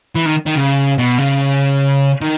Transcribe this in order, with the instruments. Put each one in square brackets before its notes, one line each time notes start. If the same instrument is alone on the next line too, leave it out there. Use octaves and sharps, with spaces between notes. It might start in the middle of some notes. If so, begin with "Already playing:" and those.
[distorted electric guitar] E3
D#3
D#3
C#3
B2
C#3
D#3